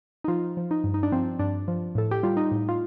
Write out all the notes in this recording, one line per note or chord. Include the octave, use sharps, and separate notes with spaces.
D#4
F3 F4
F3
D#4
G2
D#4
D4
F3 C4
G2 D4
F3
A2 A4
G4
G3 F4
D#4
A2
F4